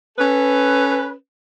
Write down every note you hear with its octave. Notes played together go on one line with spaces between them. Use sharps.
C#4 A4 B4